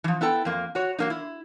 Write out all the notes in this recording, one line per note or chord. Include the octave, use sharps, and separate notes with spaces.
E3 F3
B3 E4 A4 G5
F2 A#3
F#4 C#5
F#3 A#3 D#4
E4